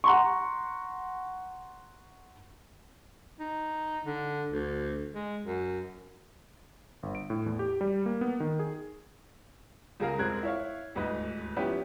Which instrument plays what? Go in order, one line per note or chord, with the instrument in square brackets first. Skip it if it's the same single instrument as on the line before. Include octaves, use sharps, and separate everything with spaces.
[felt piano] F#5 A#5 C6 C#6
[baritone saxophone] D#4
D3
D2
G#3
F#2
[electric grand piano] G1
D7
A2
E2
G4
G3
A#3
B3
D#3
G#4
[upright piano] C#2 C#3 G#4 A#4 F5
E1 G#3 C4 A#4 F#6 G#6
E4 C#5 F5
D#1 D2 G#2 B4 D#5
F3 B3 C#4 E4 G4 B4